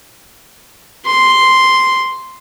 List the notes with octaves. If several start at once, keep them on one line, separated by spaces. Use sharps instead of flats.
C6